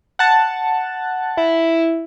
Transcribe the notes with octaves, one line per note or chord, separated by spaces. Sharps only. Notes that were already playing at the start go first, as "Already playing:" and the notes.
F#5 A5
E4